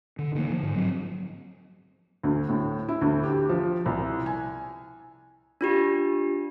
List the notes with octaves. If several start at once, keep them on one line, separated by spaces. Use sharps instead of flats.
D3
D3 D#3 F3 A#3
F3
G#2
F#3 A#3 C4
D2
A2
E4
D2
G4
F3
C2
G#5
D4 F4 G4